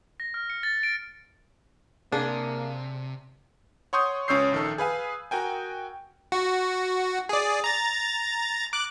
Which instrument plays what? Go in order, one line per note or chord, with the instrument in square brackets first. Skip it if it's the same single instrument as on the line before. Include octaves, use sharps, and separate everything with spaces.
[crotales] A#6
F6
C#7
A6
D7
[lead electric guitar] C3 [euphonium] A#3 [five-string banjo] D4 [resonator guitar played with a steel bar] G#4
[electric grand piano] C#5 F#5 C6 C#6 D#6 G6
C#2 C#4 C#5 E6 G6 C7
A#1 D#3 A4
G#4 B4 F5 G#5
F#4 A#4 G5 G#5
[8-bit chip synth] F#4
G#4 D5
A#5 A6
D6 F#6